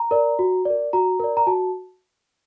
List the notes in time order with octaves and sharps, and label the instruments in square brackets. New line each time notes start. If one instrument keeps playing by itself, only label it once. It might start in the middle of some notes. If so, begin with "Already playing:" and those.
Already playing: [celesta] A#5
A#4 D5
F#4
A#4 D5
F#4 A#5
A#4 D5
A#5
F#4 A5